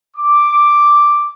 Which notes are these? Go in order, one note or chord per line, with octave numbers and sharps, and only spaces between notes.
D6